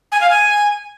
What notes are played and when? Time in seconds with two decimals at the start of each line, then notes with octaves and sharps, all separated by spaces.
0.12 G#5
0.21 F5
0.30 G#5